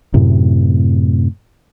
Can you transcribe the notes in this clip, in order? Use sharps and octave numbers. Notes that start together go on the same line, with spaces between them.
F#2 A2 C3